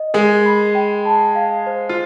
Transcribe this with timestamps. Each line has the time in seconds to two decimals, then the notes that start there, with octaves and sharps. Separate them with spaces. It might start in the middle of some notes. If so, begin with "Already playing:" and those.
Already playing: D#5
0.14 G#3 G#4 A#4
0.45 B5
0.75 G5
1.05 A5
1.35 F5
1.67 C5
1.89 F4